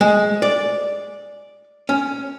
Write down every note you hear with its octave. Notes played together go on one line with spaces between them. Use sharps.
G#3
D5
C#4